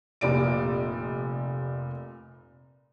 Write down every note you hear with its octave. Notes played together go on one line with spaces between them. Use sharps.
F1 A#2 D5 D7